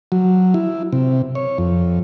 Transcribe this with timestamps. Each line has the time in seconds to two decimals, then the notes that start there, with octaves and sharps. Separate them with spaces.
0.12 F#3
0.54 E4
0.92 C3
1.35 C#5
1.58 F2